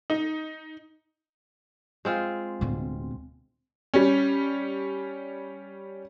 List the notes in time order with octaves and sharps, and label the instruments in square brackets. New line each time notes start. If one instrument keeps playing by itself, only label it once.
[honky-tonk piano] D#4
[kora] G#3 C4 F4
[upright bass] D1 B2
[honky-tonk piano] G3 C#4